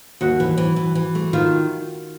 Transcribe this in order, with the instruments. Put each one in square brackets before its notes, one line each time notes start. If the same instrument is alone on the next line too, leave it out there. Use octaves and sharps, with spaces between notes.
[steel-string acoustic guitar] D#2 [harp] F#4
[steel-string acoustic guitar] E3
E3
E3
E3
A3
[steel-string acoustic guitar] D#3 [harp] F4